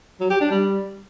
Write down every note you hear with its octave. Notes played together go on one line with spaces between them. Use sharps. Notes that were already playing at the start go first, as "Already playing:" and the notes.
F#3
G4
D4
G3